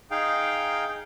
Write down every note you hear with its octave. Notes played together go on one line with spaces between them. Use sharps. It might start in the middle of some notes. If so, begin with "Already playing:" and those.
D#4 G#4 F5 G5